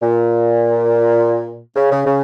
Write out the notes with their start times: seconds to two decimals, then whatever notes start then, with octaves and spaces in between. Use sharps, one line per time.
0.02 A#2
1.76 C#3
1.91 C#3
2.05 C#3